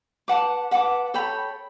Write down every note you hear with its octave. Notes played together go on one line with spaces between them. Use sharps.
B4 F#5 A5 D6
B4 F#5 A5 D6
A4 C#5 G5 B5